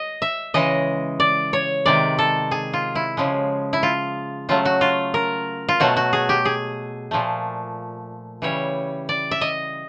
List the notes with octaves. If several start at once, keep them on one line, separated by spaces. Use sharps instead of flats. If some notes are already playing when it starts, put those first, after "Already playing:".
Already playing: D#5
E5
C#3 E3 G#3 D#5
D5
C#5
C3 D#3 G#3 D5
A4
G#4
F4
E4
C#3 F3 G#3
E4
F4
C#3 F#3 A3 F4
F#4
F4
A#4
F4
B2 F#3 A3 F#4
F#4
G#4
G4
G#4
A#2 F3 A3
C#3 E3 G3 C#5
D5
E5
D#5